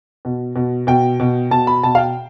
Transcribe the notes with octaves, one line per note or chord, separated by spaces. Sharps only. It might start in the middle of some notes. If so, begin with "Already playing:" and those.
B2
B2
B2 G5
B2
B2 A5
B5
B2 A5
F5
G5